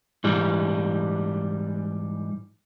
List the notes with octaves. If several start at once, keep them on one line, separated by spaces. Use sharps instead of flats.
G#2 E3 G3